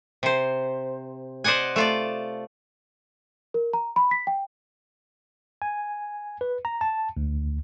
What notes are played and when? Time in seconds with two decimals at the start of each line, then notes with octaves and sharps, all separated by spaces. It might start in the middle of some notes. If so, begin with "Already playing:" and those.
0.23 C3 C5
1.44 C5 D5 D#5 F#5 G#5
1.76 A3 F4 D5
3.54 A#4
3.73 A#5
3.96 B5
4.11 B6
4.27 G5
5.62 G#5
6.41 B4
6.65 A#5
6.81 A5
7.17 D2